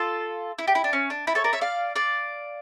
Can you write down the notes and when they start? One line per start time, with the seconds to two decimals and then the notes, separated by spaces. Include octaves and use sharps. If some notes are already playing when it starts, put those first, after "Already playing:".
Already playing: F4 A4
0.59 E4
0.68 G4
0.75 E4
0.84 D4
0.93 C#4
1.10 D4
1.27 E4
1.35 A4 C#5
1.44 A#4 D5
1.53 C#5 E5
1.61 D5 F5
1.96 D5 F5